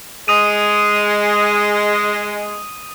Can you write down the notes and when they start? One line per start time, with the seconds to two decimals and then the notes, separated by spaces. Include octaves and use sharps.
0.28 G#3 D#6 D#7